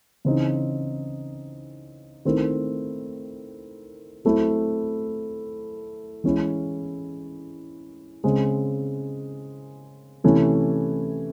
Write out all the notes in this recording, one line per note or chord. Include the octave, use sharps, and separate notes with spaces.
C#3 E3 C4 D#4
D#3 A3 C4 E4
F#3 A3 C4 E4
E3 G#3 C#4 E4
C#3 G#3 C4
C3 E3 A3 C#4